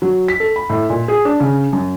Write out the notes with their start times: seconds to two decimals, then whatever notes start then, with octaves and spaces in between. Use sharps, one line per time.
0.02 F#3
0.28 B6
0.40 A4
0.56 B5
0.70 A2
0.90 A#2
1.08 G#4
1.25 D4
1.40 C#3
1.73 F#2